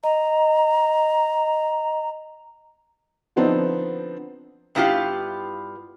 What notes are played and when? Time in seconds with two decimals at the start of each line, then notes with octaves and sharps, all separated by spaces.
0.04 D#5 A#5
3.36 D3 F3 B3 C4 D4 D#4
4.75 G2 B3 E4 F4 G4 F5